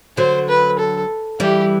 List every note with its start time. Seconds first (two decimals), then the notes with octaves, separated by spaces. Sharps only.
0.17 D3 F#3 C5
0.48 B4
0.78 A4
1.40 E3 G3 G4